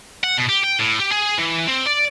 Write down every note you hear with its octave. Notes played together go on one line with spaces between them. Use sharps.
F#5
B2
G4
G5
A2
G4
G#4
E3
C4
D5